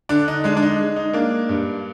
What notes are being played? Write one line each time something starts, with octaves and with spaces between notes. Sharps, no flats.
D3 D4
D#4
G#3 D4
D4
D#4
G#3
D#4
A#3 D4
G2